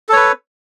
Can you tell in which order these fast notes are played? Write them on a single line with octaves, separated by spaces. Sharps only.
A4 C#5 B4